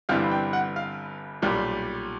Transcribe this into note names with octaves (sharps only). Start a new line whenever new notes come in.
G1 G2 E3 G3 C4 F5
G5
F#5
F5
B1 A#2 G3